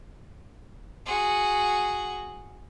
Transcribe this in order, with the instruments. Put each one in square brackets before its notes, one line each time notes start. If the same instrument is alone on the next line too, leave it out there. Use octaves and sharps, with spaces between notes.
[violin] F#4 G#4